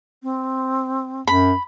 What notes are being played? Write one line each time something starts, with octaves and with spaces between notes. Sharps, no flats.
C4
F#2 B5